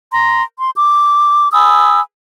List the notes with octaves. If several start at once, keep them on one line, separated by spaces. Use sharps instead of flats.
A#5 C6
C6
D6
G#5 B5 D#6 E6